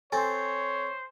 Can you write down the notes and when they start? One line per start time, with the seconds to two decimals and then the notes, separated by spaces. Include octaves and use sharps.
0.12 C4 A4 C5 C#5 G#5